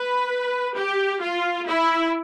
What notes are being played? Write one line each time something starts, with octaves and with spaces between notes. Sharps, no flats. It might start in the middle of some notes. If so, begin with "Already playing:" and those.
Already playing: B4
G4
F4
E4